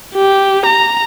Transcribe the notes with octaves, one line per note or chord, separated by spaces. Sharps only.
G4
A#5